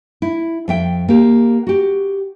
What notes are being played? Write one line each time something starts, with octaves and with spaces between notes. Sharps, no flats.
E4
F2 E5 G5
A#3 G4
F#4 G4